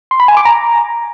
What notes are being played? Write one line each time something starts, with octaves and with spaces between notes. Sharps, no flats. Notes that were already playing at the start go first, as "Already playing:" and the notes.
C6
B5
G#5
D6
A#5